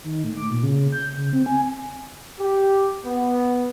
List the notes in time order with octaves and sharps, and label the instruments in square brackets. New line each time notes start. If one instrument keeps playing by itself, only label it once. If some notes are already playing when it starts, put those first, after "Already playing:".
[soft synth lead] D#3
A2
D6
A#2
C#3
G6
C#3
C4
G#5
[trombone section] G4
B3